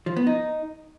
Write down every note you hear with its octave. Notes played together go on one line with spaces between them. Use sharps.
F3
B3
D#4